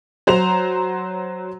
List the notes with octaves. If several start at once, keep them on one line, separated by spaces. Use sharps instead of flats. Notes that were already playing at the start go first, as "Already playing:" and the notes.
F#3 C5 A#5 F7